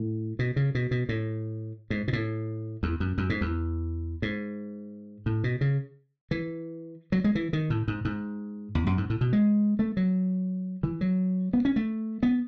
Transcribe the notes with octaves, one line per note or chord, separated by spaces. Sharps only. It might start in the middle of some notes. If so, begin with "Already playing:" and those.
Already playing: A2
B2
C#3
B2
B2
A2
G#2
B2
A2
E2
F#2
F#2
G#2
E2
G#2
A2
B2
C#3
E3
F#3
G#3
E3
D#3
A2
G#2
G#2
E2
F#2
G#2
A2
B2
G#3
A3
F#3
E3
F#3
B3
C#4
A3
B3